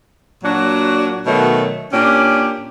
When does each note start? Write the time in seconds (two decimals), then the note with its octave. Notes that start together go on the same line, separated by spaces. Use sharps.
0.44 A#2 F#3 D4 F#4
1.26 B2 D#3 F#3 A3
1.93 A#2 C#4 D4 G4